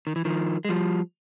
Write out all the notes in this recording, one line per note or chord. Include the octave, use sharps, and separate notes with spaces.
D#3
E3
D#3 F3
G#3
F3 G3